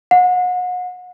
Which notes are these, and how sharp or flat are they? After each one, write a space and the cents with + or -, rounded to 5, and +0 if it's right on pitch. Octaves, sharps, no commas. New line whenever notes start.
F#5 -35